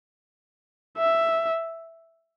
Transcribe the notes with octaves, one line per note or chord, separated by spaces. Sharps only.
E5